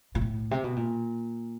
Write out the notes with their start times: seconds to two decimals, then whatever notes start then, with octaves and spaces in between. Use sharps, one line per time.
0.15 A#2
0.21 A2
0.51 C3
0.64 B2
0.76 A#2